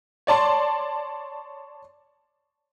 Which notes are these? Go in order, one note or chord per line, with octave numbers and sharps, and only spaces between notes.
C#5 D5 A5 C6